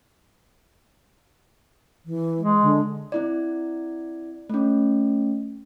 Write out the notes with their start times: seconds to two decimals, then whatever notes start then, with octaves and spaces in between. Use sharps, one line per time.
2.06 E3
2.40 G#3
2.62 D3
3.12 C4 E4 D5
4.50 A3 C#4